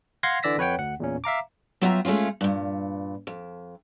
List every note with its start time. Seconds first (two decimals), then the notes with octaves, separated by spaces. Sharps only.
0.23 F5 F#5 C6 G#6 A#6
0.43 D3 E3 D5 E6 A#6 B6
0.58 F2 B4 C#5 F#5 G5
0.79 D2 F#5
1.00 E2 A#2 C#4
1.24 E5 F5 A#5 D6
1.82 F#3 B3 F4 E5 G5 A#5
2.05 G#3 A3 C4 C#4 F4
2.41 G2 A#2
3.27 F2